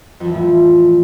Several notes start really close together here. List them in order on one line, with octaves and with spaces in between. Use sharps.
F2 F3 E3 A2